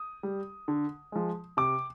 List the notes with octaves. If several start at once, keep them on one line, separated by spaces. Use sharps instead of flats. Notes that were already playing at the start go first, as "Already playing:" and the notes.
Already playing: D#6
G3
D3
F3 G#3
C3 D6